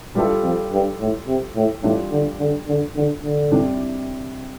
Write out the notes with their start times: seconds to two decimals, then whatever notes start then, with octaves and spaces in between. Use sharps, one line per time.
0.15 G2 G3 F4 A4
0.43 F2
0.72 G2
1.00 A2
1.27 C3
1.55 A2
1.83 A2 G3 D4 F4
2.11 D3
2.39 D3
2.67 D3
2.95 D3
3.23 D3
3.51 C3 G3 D4